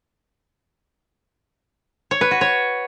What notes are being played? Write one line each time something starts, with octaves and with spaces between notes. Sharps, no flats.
C#5
B4
F#4
C#5